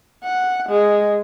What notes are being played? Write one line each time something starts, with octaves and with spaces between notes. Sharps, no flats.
F#5
G#3